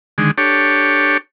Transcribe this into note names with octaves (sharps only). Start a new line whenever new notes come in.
D3 D#3 G#3
D4 G4 A4 C#5